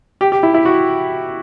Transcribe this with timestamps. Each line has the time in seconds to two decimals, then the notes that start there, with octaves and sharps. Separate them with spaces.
0.21 G4
0.32 G4
0.43 E4
0.54 E4
0.65 F#4